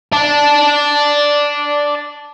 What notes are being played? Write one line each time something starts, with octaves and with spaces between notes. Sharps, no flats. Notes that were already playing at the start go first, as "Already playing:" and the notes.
D5 A5